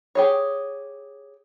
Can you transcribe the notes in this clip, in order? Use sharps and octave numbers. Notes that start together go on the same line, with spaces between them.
G4 G#4 C#5